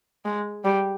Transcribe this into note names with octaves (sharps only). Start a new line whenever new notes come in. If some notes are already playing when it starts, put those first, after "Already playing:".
G#3
G3